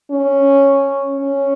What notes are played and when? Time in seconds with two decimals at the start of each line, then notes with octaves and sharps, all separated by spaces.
0.11 C#4
1.17 C#4